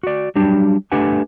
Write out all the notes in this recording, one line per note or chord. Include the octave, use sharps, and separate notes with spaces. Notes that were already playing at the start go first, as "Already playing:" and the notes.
F#4 D5
F#3 G3 D4 G4
A3 D4 G4 B4 F#5 G#5